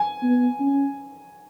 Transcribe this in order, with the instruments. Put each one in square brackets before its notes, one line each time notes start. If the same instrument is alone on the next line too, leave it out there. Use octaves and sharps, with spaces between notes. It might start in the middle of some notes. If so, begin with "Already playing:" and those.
Already playing: [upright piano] G#5
[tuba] B3
C#4